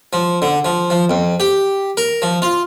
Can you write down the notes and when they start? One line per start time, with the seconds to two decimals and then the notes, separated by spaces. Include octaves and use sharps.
0.13 F3
0.42 D3
0.65 F3
0.90 F3
1.10 F2
1.40 G4
1.97 A#4
2.22 F3
2.42 F4